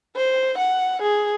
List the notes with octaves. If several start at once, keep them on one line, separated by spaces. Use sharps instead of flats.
C5
F#5
G#4